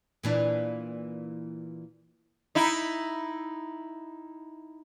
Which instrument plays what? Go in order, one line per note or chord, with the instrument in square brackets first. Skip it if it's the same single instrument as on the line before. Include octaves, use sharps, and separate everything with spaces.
[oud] A#2 E3 D4
[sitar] D#4 E4